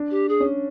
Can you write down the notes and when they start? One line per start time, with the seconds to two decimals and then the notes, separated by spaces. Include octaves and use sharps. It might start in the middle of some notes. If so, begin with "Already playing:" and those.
Already playing: D4
0.11 G4
0.29 G#4
0.40 C#4